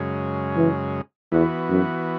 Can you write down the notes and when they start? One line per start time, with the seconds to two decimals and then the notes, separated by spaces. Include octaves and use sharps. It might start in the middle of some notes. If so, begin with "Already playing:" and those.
Already playing: F#2 C#3 G#3
0.56 E3
1.32 E2 E3 B3 F#4
1.69 F#2